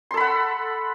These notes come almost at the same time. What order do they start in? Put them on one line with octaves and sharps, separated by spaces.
C6 A4 B5 F#5